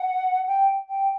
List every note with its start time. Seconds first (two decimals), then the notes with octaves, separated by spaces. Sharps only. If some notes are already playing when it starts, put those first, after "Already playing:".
Already playing: F#5
0.47 G5
0.89 G5